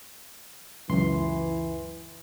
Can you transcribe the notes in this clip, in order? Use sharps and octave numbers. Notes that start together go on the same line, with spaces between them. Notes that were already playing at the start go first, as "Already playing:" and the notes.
C#2 F#2 E3 C6